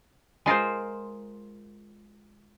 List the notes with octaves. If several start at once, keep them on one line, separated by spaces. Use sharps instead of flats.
G#3 F4 A#4 C5